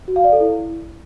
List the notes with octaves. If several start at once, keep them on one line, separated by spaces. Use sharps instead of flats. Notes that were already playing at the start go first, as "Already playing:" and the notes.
F#4
F5
D5
A4
E4